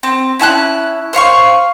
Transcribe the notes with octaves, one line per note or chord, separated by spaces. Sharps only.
C4
C#4 E4 A5 F#6
C5 C#5 F5 C#6